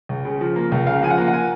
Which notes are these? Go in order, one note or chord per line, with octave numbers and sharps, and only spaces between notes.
C#2
C#3
F3
A#3
C#2
C#3 F5
F3 G#5
F#5
A#3
F#5
G#5